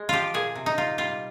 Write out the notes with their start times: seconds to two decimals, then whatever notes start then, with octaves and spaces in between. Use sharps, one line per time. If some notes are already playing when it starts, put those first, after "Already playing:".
Already playing: G#3
0.09 F3 F4 G4
0.34 A#2 G#4
0.55 C3
0.66 D#4
0.77 G3 F4
0.98 G3 F4